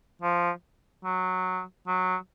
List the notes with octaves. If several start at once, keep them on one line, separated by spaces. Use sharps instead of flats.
F3
F#3
F#3